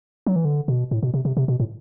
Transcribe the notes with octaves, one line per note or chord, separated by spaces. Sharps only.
F#3
E3
D3
B2
A2
B2
C3
C3
C3
B2
A2